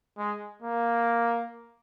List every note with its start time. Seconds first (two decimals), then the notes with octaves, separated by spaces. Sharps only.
0.18 G#3
0.62 A#3